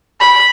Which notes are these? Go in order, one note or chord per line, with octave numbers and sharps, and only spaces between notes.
B5